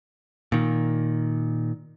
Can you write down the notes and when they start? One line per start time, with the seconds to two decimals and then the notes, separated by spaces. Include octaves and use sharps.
0.52 A#2 D#3